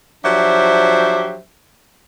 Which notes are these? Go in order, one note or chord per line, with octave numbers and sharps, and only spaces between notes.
F3 F#3 D4 G4 C5 E5